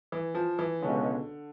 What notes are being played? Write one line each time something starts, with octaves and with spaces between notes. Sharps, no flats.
E3
F3
E3
C#2 B2 D3 G#3 C#4